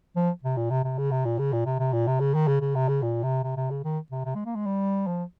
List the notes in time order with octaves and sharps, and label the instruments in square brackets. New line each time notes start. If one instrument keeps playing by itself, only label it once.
[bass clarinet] F3
C3
A#2
C3
C3
C#3
C3
A#2
C#3
A#2
C3
C3
A#2
C3
C#3
D#3
C#3
C#3
C3
C#3
A#2
C3
C3
C3
C#3
D#3
C3
C3
G#3
A#3
G#3
G3
F3